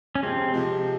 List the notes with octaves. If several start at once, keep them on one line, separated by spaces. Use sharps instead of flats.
C#4
C3 F3 G#3 C4
C3 F3 G#3